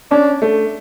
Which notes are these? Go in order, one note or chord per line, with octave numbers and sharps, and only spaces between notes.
C#4 D4
A3